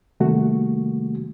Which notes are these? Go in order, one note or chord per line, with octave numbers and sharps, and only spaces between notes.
C3 D#3 G3 A3 A#3 F#4